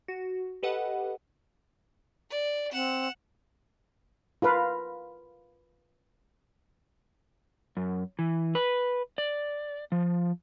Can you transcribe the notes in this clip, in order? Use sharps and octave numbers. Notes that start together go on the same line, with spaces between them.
F#4
G4 A4 B4 D#5 F#5
D5
C4 F#5 E7
F4 A#4 B4 F5
F#2
E3
B4
D5
F3